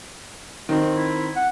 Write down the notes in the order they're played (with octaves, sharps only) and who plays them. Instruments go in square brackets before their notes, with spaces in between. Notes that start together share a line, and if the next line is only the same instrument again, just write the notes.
[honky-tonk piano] D#3 C4 [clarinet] F#4
[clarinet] E4
F#5